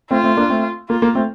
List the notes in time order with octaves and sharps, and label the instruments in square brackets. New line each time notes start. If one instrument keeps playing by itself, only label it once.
[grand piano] A3 C4 [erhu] F4
[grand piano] A3 C4
A#3 D4
A3 C4
[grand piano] A#3 [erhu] F4
[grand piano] A#3
A3 C4